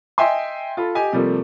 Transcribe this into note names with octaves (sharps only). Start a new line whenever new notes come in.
D#5 E5 G5 G#5 C6
F4 A4 B5
G4 D#5 G#5
C3 F3 G3 A3 A#3